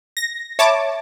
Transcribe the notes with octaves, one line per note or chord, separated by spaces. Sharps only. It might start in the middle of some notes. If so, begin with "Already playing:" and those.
A#6
C#5 E5 A5 B5 D6 A6